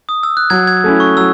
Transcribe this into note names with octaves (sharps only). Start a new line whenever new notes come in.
D#6
E6
F#6
F#3 G#6
G#6
A3 C#4 E4
C#6
F#3 E6